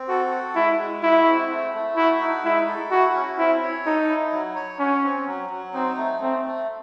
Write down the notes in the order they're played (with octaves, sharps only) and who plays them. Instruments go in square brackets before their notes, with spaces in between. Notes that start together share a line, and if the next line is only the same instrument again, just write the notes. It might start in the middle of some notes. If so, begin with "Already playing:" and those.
Already playing: [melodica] C4
[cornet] F#4 [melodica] A4
[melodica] F#4
[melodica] G#3 [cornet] E4
[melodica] G#3
[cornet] E4 [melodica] F#4
[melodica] C4
A3
A3
[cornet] E4 [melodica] F#4
[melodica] D#4
[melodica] G#3 [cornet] E4
[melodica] A4
[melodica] E4 [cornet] F#4
[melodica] C#4
[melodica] C4 [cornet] E4
[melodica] C#5
[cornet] D#4 [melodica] A4
[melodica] E4
F#3
C#5
[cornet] C#4 [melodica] F#4
[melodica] C4
F#3
F#3
[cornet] C4 [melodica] D#4
[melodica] A3
[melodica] A3 [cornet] C4
[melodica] A3